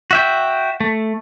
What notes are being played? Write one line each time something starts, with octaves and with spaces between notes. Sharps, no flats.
F#4 E5 G5
A3